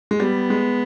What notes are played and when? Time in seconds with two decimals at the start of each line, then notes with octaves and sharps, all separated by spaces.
0.11 G#3
0.20 G3 B3
0.50 G#3